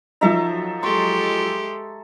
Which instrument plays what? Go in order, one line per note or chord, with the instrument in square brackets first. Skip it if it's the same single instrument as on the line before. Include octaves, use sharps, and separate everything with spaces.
[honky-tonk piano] F3 F#3 D#4 [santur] A4 E5 A#5
[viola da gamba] G#3 G4 A4 [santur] C6 C#6